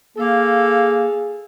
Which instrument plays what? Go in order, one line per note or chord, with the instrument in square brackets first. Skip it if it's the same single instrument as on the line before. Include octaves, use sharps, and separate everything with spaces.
[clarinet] A#3 [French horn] G#4 [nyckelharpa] A4 F5